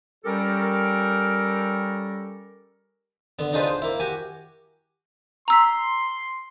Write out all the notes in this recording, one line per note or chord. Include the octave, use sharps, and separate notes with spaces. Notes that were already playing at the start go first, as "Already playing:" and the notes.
G3 C#4 G4 A4 A#4
D3 B3
D4 D#4 F4 G#4 B4 C5
C5
A#3 E4
F#4 G4 G#5
A#5 C6 E6 B6